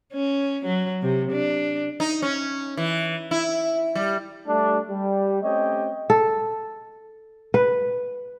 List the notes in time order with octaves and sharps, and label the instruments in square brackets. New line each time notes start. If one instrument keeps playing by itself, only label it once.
[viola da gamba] C#4
F#3
C3
D4
[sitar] D#4
C#4
E3
E4
G3
[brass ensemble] G3 A3 D4
G3
A3 C4 C#4 G4 C#5 D#5
[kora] A4
B4